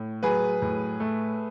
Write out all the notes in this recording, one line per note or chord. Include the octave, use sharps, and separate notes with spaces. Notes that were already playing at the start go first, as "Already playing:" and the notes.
Already playing: A2
F#3 G#4 B4
A2
A3